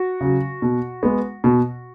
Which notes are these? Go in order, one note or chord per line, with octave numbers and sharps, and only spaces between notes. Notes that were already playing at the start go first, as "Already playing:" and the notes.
Already playing: F#4
C#3 F#3
B2
G#3 B3
B2